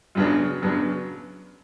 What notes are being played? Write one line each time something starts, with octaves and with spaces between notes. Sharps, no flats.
F#2 C#3 F#3 B3 D4
F#2 C#3 F#3 B3 D4